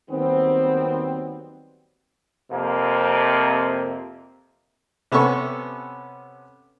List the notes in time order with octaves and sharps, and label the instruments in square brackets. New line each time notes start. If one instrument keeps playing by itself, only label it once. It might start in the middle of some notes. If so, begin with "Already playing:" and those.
[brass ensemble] D#2 D#3 F#3 G3 B3 C4
[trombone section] F2 C3 A#3
[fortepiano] C3 B3 C#4 A4 C#6